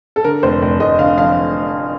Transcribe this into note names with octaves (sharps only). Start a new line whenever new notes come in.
A4
D3 A#4
F1 C5
F1
F1 D#5
D3 F5
F2 F5